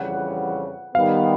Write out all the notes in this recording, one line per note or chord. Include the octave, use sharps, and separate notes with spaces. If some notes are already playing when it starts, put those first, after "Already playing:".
Already playing: F2 C#3 E3 G3 F#5
D#3 G3 B3 F5